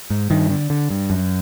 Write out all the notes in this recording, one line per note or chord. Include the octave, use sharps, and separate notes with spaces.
G#2
G2 D#3
D3
D3
G2
F#2